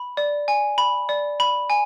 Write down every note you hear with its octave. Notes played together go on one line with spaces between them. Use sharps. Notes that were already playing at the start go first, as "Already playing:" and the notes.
Already playing: B5
D5
G#5
B5
D5
B5
G#5